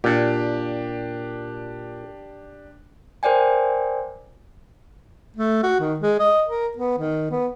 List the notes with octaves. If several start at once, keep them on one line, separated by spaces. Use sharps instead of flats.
A#2 D4 G4
A#4 C5 D5 G5 G#5
A3
F#4
D#3
G#3
D#5
A#4
B3
D#3
B3